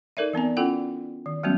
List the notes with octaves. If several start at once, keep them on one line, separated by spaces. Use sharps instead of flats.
D#4 A4 A#4 D5 E5
E3 B3 C4 G#5
C#4 E4 F4 A4 F#5 G5
D#3
F#3 G3 A3 B3 C#4 F#4